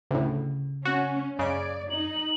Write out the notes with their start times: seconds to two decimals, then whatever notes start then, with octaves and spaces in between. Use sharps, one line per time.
0.11 D2 A2 C#3
0.85 C#4 F#4
1.39 F#2 C#3 D5 D#5 G#6
1.91 D#4 F#7